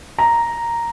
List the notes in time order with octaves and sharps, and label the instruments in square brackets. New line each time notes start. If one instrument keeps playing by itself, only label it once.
[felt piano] A#5